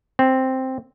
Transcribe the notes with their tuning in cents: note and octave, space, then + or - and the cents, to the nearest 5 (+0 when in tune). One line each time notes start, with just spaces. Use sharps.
C4 +0